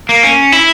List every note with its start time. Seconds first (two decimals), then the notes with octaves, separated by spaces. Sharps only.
0.09 A#3
0.23 C#4
0.52 E4